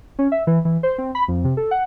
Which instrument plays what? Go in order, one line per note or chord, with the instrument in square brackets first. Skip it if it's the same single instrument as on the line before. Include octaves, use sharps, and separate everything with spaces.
[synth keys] C#4
E5
E3
E3
C5
C4
B5
F2
C3
A4
F#5